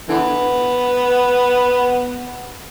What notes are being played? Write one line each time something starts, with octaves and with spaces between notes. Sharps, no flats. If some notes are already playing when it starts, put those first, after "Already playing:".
D3 E3 B3